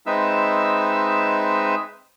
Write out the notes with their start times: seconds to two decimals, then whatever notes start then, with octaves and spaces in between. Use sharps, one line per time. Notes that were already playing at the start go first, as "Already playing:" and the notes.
0.06 G#3 C4 D#4 B4 E5 E6